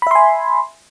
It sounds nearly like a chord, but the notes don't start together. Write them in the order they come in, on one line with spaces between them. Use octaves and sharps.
B5 E5 C6 G#5